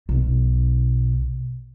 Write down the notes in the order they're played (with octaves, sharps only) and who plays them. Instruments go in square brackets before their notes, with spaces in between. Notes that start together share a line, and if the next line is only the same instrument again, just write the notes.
[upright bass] B1 B2